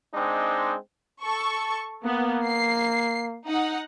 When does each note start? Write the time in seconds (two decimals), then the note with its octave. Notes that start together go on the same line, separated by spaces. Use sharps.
0.13 G#3 C4 D4 D#4
1.22 A4 C#6
2.05 A#3 B3
2.47 C7
3.47 D#4 F#5